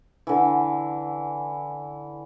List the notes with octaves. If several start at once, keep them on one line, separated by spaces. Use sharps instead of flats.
D3 E3